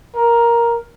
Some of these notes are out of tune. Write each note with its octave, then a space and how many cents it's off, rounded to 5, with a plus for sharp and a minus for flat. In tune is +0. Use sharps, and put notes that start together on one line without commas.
A#4 +5